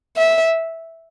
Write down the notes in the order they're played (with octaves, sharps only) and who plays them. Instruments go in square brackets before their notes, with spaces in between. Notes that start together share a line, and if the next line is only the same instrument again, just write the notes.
[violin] E5